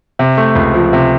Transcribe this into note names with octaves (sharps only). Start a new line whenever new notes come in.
C3
A3
C#2
F3
C3